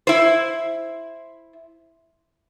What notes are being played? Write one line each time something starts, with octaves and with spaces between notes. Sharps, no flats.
E4 C5